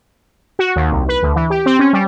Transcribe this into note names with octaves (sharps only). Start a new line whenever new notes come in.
F#4
D#2
C2
B4
D2
E3
G4
C4
C#4
G3